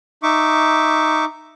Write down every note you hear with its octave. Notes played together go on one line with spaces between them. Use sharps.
D#4 E5 C#6 D6